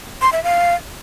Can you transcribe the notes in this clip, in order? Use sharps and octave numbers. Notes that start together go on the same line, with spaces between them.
C6
E5
F5